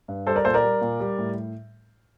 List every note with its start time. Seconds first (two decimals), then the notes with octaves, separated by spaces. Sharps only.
0.08 G2
0.27 G3 A4 C5
0.36 A#4 D5
0.45 A#2 A4 C5
0.54 A#4 D5
0.63 G3
0.81 A#2
1.00 G3
1.18 A2